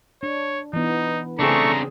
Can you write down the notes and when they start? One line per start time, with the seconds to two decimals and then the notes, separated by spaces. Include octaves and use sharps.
0.23 D4 C#5
0.73 E3 B3 D#4
1.39 C#3 A3 C4 D4 G#4 A#5 C#6